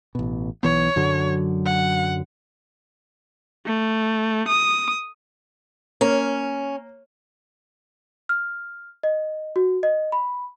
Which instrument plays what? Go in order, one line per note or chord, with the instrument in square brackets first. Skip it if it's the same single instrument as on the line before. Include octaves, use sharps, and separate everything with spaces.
[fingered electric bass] A1 B2
[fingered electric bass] B1 E3 B3 [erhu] C#5
[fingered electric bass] F#2 D3 F#3
[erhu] F#5
[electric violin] A3
D#6
[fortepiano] A#3 [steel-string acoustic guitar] C#4
[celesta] F6
D#5
F#4
D#5
B5